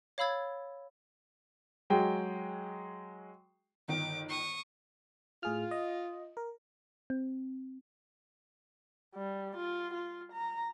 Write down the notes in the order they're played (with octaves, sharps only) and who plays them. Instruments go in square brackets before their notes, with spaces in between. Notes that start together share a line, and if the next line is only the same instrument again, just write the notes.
[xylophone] C#5 F5 B5 E6 G#6 A6
[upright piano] F#3 G#3 G5
[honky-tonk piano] G1 D#3 [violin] D6
[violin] C#6 D#6
[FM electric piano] A2 G#4 F6 [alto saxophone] F4
[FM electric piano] D#5
A#4
[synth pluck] C4
[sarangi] G3
F4
F4
A#5